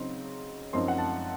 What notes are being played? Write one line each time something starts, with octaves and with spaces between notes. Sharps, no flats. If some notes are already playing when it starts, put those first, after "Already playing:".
Already playing: C#3 F#3 C4 D#4 C6
F#2 F3 C4 D#4 C6
F#5
A5